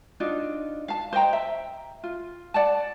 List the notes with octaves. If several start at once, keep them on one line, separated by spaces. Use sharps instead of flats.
D4 D#4 F4 F#4
F5 A5
C5 D#5 G5 A#5
E5
F4
D5 F#5 A5